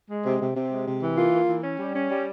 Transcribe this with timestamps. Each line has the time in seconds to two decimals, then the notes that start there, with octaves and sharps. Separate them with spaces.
0.10 G#3
0.25 C3
0.40 C3
0.56 C3
0.71 G#3
0.86 C3
1.02 E3
1.17 A#3 F4
1.33 A#3
1.48 E3
1.64 C#4
1.79 G3
1.94 C#4
2.10 G3